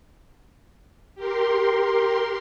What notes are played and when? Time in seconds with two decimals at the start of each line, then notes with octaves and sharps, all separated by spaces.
1.15 G4 A#4 C6